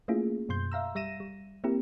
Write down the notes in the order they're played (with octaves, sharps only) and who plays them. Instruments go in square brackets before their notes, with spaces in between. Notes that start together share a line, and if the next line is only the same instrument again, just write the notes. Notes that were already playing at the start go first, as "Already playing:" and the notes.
[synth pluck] A3 A#3 C#4 E4 F4 G#4
F#2 B2 C6 G6
E5 F5 A#5 E6
G3 E5 A#6 D#7 E7
G3
A#3 C4 E4 G4 A#4